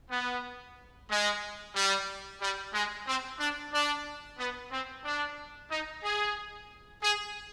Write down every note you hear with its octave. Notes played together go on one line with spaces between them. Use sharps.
B3
G#3
G3
G3
G#3
C4
D4
D4
B3
C4
D4
D#4
G#4
G#4